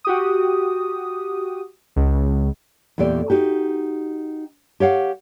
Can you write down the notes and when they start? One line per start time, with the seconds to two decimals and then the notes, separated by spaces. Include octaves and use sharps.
0.05 F#4 G4 D#6
1.96 C#2
2.98 E2 A#2 A3 G4 D5
3.30 D#4 F#4 G4
4.80 G4 C#5 F5 F#5